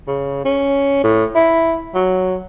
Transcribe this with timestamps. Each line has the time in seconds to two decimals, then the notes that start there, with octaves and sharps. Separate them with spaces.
0.07 C#3
0.45 C#4
1.03 A2
1.35 E4
1.94 F#3